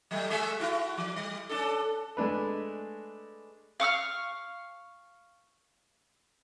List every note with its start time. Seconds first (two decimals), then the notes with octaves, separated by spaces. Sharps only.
0.11 F#3 G3 A3
0.30 G#3 G#4 E5
0.60 E4 F#4
0.98 F3
1.16 G3
1.49 C#4 D4 A4
2.17 G#3 A3 D4 B4
3.80 F5 C#6 D#6 F6